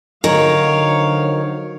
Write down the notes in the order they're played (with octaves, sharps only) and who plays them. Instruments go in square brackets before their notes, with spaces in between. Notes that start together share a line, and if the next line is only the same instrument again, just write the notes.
[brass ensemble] D3 F3 F#3 [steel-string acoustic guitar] D#3 [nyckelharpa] C#5 F5